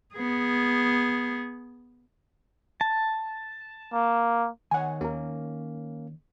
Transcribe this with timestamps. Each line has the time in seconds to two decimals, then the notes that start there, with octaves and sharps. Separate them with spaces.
0.15 B3 G#4
2.81 A5
3.93 A#3
4.71 D#3 C#5 F#5 G#5
5.01 D#2 A#3 C#4 A#4